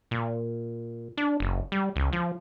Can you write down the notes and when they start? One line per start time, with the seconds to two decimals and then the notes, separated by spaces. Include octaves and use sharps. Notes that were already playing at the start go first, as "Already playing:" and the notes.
0.11 A#2
1.17 D4
1.40 F#1
1.72 G3
1.96 C#2
2.13 F3